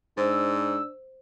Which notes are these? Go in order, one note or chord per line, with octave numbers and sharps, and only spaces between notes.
G#2 D4 C5 E6